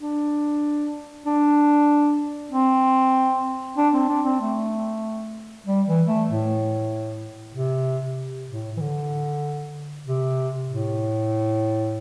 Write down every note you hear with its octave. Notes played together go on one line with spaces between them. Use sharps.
D4
D4
C4
D4
C4
D4
C4
A3
G3
E3
A3
A2
C3
A2
E3
D3
C3
A2